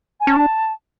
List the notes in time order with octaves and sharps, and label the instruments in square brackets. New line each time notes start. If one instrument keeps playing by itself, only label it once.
[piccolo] G#5
[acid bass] C#4 [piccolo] A5
[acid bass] D4